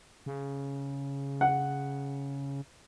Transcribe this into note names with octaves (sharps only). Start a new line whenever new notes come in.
C#3
F#5